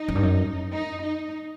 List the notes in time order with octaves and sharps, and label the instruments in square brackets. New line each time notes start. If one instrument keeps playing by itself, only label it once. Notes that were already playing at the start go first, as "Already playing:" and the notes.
Already playing: [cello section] D#4
[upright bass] F#2
G2
F#2
[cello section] D#4
D#4